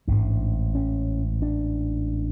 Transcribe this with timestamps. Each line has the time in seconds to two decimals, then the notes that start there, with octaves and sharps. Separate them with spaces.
0.07 A1 G#2 D4
0.75 C#4
1.42 D4